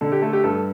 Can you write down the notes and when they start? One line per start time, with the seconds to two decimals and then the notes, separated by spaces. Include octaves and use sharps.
0.01 D3 A4
0.12 G4
0.22 A3 A4
0.33 G4
0.44 G2 A4